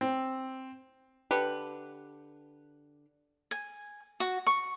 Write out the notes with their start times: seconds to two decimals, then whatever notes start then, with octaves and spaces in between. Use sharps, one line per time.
0.01 C4
1.31 D3 G4 B4
3.51 G#5
4.20 F#4
4.47 C#6